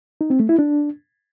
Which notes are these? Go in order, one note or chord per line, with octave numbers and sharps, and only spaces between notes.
D#4
C4
A3
E4
D4